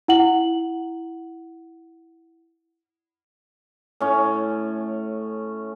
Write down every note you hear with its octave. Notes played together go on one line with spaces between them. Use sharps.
E4 F#5 F#7
A2 C#4